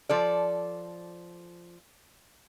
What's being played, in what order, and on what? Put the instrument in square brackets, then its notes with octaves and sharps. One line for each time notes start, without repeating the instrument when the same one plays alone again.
[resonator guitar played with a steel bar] F3 A4 D5